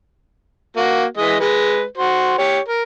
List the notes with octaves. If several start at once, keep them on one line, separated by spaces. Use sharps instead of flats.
A#3 F#4
E3 G#3 D#5
G#3 B4
F#4 C5
G4 C#5
A#4